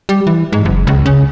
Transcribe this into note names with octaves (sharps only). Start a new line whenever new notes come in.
G3
E3
G#2
F#1
C#2
C#3